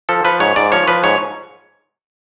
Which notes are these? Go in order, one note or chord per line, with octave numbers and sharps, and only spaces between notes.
F3 A4
F3 B4
G#2 C#5
G#2 D5
F3 C#5
F3 B4
G#2 C#5